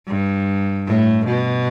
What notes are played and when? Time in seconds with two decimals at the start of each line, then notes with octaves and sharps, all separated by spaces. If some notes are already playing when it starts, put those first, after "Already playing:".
0.08 G2
0.87 A2
1.27 B2